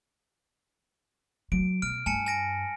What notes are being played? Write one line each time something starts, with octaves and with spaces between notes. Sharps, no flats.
F#3 D7
B2 F6 D7
G2 G#5 A5 C#7
G#5 A#6 D7